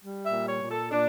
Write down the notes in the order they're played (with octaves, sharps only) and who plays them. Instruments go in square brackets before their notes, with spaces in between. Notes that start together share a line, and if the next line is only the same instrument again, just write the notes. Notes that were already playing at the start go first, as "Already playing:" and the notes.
[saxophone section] G3
E5
A#2
C#5
A#2
A4
A#2 D4